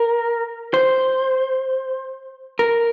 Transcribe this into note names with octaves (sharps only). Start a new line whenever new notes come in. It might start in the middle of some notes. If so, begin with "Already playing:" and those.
Already playing: A#4
C5
A#4